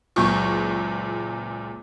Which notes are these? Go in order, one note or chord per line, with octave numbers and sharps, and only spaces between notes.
F#1 C#2 A#2 C#6